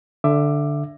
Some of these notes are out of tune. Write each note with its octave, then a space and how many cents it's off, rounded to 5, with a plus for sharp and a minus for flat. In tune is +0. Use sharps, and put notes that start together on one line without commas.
D3 +0 E5 +20 D6 +10